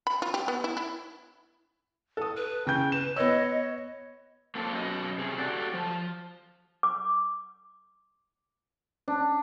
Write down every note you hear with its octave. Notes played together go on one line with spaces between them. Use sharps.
B5
F4
G4
B3
E4
E4
A4 D#6
B4
C#3 G5 G6
B4 E7
B3 C#5 D#5 E6
A#3 C4 F4 A4
F#2 B2 F#4 D#5
C3 G#4
F#4 G4 A4 D5 F#5
F3
D6
D4